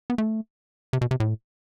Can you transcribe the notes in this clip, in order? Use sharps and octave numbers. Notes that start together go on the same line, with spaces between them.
B3
A3
C3
B2
C3
A2